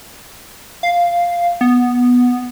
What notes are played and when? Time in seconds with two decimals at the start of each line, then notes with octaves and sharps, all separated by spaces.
0.83 F5
1.61 B3